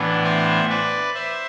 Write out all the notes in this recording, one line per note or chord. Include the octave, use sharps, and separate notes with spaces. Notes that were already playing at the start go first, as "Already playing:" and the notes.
Already playing: A2 E3 B3 D4
C5 E5
B4 D5
C5 E5